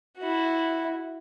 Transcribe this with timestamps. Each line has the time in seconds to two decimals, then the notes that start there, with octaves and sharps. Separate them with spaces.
0.18 E4 F#4